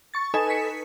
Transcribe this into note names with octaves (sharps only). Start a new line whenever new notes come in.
C#6 A6
D#4 A4 B4 G#5 E7
B6 C#7